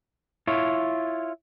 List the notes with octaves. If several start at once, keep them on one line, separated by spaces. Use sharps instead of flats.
E4 F4 C#5